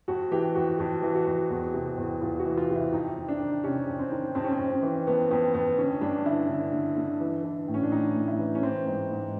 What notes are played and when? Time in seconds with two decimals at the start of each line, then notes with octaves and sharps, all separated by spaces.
0.08 F2 F#4
0.31 E3 G4
0.55 F2 F#4
0.79 F2 F#4
1.03 E3
1.15 F#4
1.27 F2
1.50 E2
1.74 C3
1.98 E2
2.22 E2 F4
2.39 F#4
2.46 E3
2.57 F4
2.69 C3
2.75 E4
2.92 F2 D#4
3.16 F2
3.28 D4
3.40 D#3
3.64 C3 C#4
3.88 F2
3.99 C4
4.12 D#3
4.35 F2 C4
4.44 C#4
4.53 C4
4.59 F2
4.71 C#4
4.83 E3
5.07 F2 B3
5.31 F2 B3
5.54 F2 B3
5.78 D3 C#4
6.01 G2 D4
6.25 D3 E4
6.49 D3
6.73 D3
6.97 D3
7.20 E3
7.44 E3
7.68 A2
7.74 C#4
7.83 D4
7.92 A2 D#4
8.15 A2
8.28 E4
8.39 E3
8.55 C#4
8.63 E3 C4
8.87 G#2
9.11 G#2